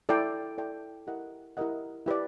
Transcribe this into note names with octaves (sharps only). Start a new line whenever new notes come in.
E4 A4 D5 G5
E4 A4 D5 G5
E4 G4 A#4 D#5 F#5
E4 G4 A#4 D#5 F#5
E4 G4 B4 D5